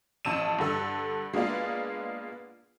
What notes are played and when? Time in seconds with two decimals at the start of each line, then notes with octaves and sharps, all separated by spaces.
0.25 A1 F2 A5 E6 D#7 E7
0.59 G2 D3 A4 E6
1.33 G#3 A#3 B3 D4 F4